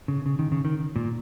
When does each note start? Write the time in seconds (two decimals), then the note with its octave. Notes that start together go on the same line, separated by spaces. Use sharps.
0.08 C#3
0.26 C#3
0.39 D#3
0.52 C#3
0.65 D#3
0.96 A#2